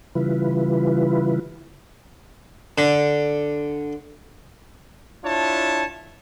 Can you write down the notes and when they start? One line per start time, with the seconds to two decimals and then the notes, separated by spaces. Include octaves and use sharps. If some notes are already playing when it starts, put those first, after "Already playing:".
0.15 C#3 E3 G3 E4 F4 B4
2.78 D3
5.24 D4 E4 F4 C#5 A5